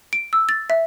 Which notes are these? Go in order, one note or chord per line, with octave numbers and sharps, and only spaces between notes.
D7
E6
A6
E5